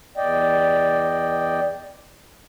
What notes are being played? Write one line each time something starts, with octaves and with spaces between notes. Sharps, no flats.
E2 D5 D#5 G5